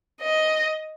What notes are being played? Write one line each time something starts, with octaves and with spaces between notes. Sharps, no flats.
D#5